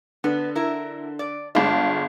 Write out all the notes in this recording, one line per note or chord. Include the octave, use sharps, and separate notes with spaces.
D3 B3
E4 A#4
D5
G1 G#3 D4 F4